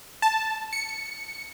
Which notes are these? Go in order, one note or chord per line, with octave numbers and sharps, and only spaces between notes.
A5
C#7